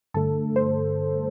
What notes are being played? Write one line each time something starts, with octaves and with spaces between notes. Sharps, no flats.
G2 D3 A3 A4
C5